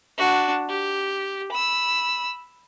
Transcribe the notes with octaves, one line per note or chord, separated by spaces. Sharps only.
D4 F#4
G4
B5 E6